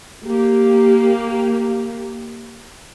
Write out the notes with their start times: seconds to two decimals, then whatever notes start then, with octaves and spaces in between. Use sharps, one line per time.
0.26 A#3 G4